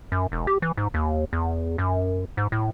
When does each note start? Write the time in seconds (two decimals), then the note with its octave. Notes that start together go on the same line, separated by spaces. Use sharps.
0.12 F#2
0.32 E1
0.47 G4
0.62 E3
0.77 G#2
0.94 D#2
1.33 E2
1.78 F#2
2.37 G#2
2.52 A2